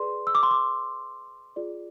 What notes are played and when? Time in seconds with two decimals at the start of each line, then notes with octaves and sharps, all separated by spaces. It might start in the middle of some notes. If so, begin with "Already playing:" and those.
Already playing: G#4 B4 D5 C6
0.27 E6
0.35 D6
0.43 C6
0.51 D6
1.56 F4 G#4 D5